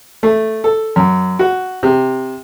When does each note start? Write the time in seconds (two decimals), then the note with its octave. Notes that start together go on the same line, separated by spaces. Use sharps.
0.23 A3
0.64 A4
0.96 F#2
1.39 F#4
1.83 C3